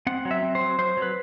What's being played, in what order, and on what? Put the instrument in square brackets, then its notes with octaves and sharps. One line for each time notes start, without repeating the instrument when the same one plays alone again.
[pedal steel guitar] C4 F#5
F#3
E5
C4
C5
F#3
F#3 C5
F#3
B4